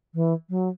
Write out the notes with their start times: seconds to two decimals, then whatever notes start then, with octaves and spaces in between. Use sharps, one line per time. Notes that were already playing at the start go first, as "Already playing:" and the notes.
0.14 E3
0.49 F#3